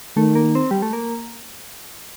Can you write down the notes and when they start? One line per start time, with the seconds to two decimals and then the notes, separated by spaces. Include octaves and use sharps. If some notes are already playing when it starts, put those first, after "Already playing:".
0.16 D#3 A3
0.35 A#3
0.55 C4
0.71 G3
0.82 A3
0.93 A#3